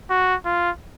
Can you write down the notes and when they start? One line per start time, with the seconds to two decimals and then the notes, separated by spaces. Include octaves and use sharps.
0.10 F#4
0.45 F4